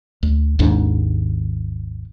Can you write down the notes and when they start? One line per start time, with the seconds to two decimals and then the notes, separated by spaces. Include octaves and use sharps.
0.23 D2
0.59 G#1 D#2 G#2 D4